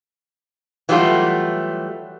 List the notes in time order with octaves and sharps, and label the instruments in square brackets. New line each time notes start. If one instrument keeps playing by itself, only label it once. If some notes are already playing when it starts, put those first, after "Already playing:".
[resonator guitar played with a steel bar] E3 F#3 G3 A3 F4